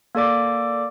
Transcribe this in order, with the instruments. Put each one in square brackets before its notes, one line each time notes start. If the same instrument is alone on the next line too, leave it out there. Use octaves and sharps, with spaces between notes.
[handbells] A#3 A4 D5 D6